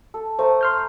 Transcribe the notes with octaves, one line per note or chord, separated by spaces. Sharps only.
A4
A3 C5 A#5
C6 F6 G6